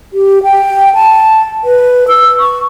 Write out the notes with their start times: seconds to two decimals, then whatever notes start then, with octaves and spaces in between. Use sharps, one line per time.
0.13 G4
0.44 G5
0.95 A5
1.64 B4
2.08 E6
2.40 C#6